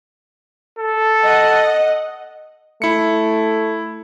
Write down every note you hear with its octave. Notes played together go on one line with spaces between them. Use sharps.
A4
D#5 F#5
A3 E4 C#7